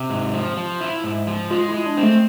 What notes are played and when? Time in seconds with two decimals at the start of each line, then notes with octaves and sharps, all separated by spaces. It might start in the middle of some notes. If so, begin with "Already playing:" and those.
Already playing: C3
0.10 G#2
0.34 F3
0.57 F3
0.80 E4
1.04 G#2
1.27 F3
1.50 G#3 F4
1.68 E4
1.74 G#3
1.85 D4
1.97 C4
2.03 A3